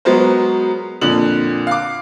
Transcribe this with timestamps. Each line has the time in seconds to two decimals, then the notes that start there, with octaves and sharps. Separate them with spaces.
0.05 F#3 G#3 B3 A#4 C5
1.01 F2 A#2 D3 F#7
1.67 F5 D6